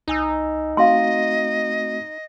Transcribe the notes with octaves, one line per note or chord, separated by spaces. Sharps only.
C2 D#4 G#5 E6
A3 C4 F#4 D#5 F5 C6